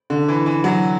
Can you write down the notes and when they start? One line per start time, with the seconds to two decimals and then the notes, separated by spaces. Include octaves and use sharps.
0.10 D3
0.28 E3
0.46 E3
0.64 F#3